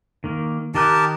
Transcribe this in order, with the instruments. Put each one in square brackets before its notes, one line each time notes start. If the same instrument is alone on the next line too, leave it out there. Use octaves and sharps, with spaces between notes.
[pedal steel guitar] D#3 A#3
[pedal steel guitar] D#3 D#5 F#6 [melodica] G4 A#4 A5